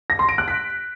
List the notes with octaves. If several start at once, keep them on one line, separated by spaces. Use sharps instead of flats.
A#6
C6
D7
F#6
B6